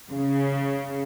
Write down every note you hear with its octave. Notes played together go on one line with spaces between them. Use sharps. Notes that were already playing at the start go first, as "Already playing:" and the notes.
C#3